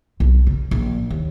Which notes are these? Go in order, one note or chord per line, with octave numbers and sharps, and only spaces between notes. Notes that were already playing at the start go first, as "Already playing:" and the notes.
B1
C#3
A#1
D#2